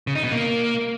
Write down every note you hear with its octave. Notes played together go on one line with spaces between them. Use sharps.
C#3
D#4
B2
A#3